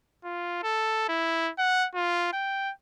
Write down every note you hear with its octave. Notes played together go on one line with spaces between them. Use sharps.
F4
A4
E4
F#5
F4
G5